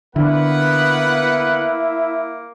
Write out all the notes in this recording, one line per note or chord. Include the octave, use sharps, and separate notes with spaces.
D3 A#3 B3 E4 B4 F#5